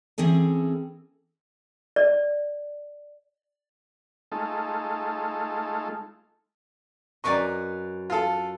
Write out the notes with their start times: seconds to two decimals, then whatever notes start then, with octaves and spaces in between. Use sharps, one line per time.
0.18 E3 C4 C#4 G#4 A4
1.96 D5
4.32 G#3 A3 D#4 F4 A4
7.24 F#2 B4 D5 D#5 C#6
8.10 F4 A4